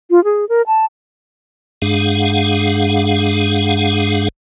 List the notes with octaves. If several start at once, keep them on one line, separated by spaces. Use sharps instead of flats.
F4
G#4
A#4
A5
G2 G#3 D4 G#4 F5 F#5